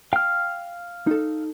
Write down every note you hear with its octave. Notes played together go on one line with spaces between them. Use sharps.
F5 G5 F6
D#4 A4